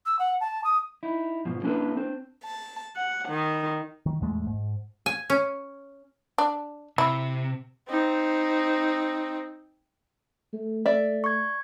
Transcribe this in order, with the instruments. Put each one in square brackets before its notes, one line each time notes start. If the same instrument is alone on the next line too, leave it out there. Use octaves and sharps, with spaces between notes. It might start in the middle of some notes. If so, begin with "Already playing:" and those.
[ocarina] E6
F#5
A5
D#6
[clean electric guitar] D#4 E4
G#2 B2 F3
A#3 C#4 D4 E4 A4 B4
C4 D4 C5
[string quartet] A5
F#5
D#3
[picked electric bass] D#3
A1 E2 G#3 A3
G#2
[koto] G#5
C#4
[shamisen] D4
[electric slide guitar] C3 [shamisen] E4
[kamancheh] C4 D#4
[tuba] A3
[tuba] A3 [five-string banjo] D5 E5
[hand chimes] C#6 G#6